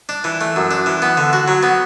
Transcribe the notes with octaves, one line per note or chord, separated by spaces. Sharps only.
D4
E3
A3
F#2
D4
E3
B3
D3
F#4
F#3
B3